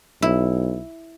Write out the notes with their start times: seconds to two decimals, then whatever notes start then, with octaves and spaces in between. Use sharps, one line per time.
0.22 B1 E4